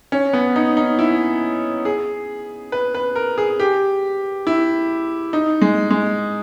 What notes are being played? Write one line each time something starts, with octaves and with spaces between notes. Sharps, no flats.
C#4
B3
D#4
D#4
E4
G#4
B4
B4
A#4
G#4
G4
E4
D#4
G#3
G#3